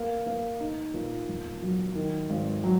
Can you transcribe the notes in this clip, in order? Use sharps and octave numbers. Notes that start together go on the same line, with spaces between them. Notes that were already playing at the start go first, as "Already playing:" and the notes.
Already playing: A#3
A#3
D#4
A#2
E1
F#3
D#3
G#1
F#3